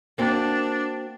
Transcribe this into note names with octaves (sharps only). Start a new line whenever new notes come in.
A#3 C4 D4 F#4